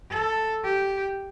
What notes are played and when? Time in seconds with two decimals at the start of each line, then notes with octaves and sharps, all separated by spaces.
0.11 A4
0.64 G4